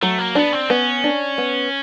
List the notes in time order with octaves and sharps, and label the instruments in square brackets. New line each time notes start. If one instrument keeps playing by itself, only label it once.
[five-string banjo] F#3 [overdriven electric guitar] A3
[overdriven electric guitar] A#3
[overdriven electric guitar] B3 [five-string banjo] D4
[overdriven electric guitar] C4
[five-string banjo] B3 [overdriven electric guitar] C#4
[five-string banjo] D4
B3